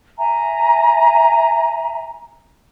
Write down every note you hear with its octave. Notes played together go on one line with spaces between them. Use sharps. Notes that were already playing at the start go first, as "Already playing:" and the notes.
E5 G#5 A#5